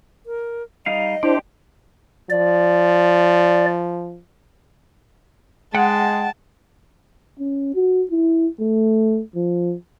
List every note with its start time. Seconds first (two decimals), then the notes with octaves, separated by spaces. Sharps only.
0.26 A#4
0.86 G3 D#4 D#5 F5
1.23 D4 E4 G4 C5 D5
2.30 F3 D5
5.75 G#3 F#5 G5 A5 F#6
7.39 C#4
7.75 F#4
8.11 E4
8.60 A3
9.36 F3